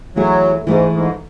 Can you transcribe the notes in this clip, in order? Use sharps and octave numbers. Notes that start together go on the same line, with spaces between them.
E3 F#3 A3 E4 G#4
G#2 E3 A3 E4 G#4
G#2